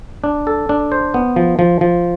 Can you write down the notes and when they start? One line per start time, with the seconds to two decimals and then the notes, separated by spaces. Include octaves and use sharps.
0.24 D4
0.47 A4
0.69 D4
0.92 C5
1.14 B3
1.36 F3
1.59 F3
1.81 F3